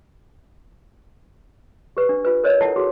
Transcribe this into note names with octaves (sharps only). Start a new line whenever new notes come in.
G4 B4
D4
F4 B4
A#4 C5 C#5 D#5
E4 A4 F#5 A5
F#4 G#4